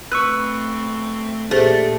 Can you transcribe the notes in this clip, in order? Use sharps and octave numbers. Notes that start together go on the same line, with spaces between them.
A3 C4 B4 C#6 E6 F#6
A#2 A3 D4 G4 G#4 C5